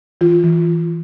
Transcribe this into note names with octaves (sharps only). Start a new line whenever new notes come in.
E3 F4
E3